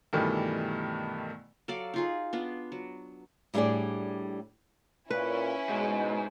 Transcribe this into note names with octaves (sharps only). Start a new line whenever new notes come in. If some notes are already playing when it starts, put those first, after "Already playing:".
G2 B2 D#3 E3 G3 A3
F#3 A4 D5 F5
D#4 F4 G#4
B3 D4 F4
F#3
A2 G3 D4 D#4 G#4 D5
A#2 C#4 E4 B4
G#2 B2 G#3